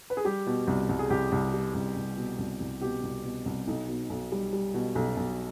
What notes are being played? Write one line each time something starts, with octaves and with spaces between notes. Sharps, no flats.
B4
G#4
G3 G4
B2
C2
C2
G#4
C2 G4
C2
G3
C2
C2
B2
C2
C2
B2 G4
C2
B2
C2
B1 D#4
B2
B1
G3
G3
B2
B1
B1